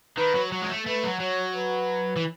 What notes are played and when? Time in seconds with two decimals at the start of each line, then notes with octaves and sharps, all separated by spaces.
0.18 D#3 B4
0.35 F#3
0.52 F#3
0.62 G#3
0.70 A3
0.86 A3 B4
1.04 F#3
1.20 F#3 C#5
1.55 B4
2.16 E3